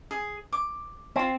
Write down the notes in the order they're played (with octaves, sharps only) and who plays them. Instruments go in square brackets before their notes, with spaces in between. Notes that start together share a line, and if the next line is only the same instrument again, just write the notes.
[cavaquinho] G#4
D6
[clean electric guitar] C4 [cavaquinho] E4 F4